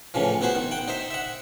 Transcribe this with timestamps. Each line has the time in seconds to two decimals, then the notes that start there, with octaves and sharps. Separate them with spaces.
0.14 A2 C#3 E3 F3
0.41 B3 E4 F#4 C5
0.55 D#3
0.71 F#5 G5
0.88 D#4 C5 E5
1.11 E5 F#5